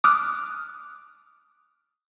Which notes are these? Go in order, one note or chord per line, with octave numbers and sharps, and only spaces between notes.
D6 D#6 F6 F#6